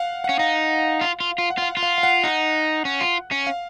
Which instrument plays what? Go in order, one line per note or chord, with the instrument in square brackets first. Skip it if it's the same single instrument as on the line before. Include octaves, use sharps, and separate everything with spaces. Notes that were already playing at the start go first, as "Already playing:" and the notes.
Already playing: [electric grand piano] F5 F#5
[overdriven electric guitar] C#4 [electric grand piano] F#5
[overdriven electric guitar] D#4 [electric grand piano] F5
[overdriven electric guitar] F4
F4
F4
[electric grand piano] F#5
[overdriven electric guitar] F4
[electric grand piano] F5
[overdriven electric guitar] F4
[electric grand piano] F5
F5
F#5
[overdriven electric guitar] D#4 [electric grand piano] F#5
[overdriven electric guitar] C#4
F4
C#4
[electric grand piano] F5